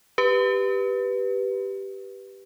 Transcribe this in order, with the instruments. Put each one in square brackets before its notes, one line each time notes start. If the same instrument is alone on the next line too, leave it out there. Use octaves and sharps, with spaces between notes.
[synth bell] G4 B4